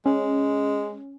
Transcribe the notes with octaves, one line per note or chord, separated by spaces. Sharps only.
G#3 C#4